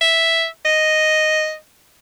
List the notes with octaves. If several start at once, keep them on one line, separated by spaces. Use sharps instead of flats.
E5
D#5